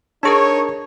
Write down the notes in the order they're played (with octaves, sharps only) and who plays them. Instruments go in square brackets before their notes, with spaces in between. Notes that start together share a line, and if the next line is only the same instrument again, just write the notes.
[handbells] D4 G#4 A#4 [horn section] D#4 C#5 [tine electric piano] A5 C#6